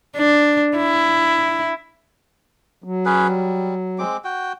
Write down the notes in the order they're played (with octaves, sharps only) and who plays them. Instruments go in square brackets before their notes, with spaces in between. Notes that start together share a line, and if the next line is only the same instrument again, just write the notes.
[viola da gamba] D4
E4
[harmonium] F#3
[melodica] C#4 G#4 B4
G3
G#3 C4 D6
F#4 G5